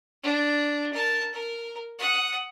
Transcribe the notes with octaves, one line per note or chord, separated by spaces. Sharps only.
D4
A#4 A5
A#4
F#5 D#6